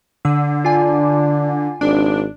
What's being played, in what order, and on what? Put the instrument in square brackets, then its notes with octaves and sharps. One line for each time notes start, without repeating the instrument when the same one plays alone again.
[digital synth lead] D3 [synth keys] E6
[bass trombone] D4 [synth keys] F4 G#5
[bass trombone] G#1 [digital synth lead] D4